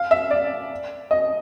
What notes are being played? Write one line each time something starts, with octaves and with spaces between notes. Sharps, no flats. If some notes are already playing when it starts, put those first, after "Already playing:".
Already playing: F5
E5
D5
D#5